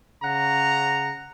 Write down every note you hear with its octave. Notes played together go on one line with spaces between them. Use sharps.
C#3 F#5 A#5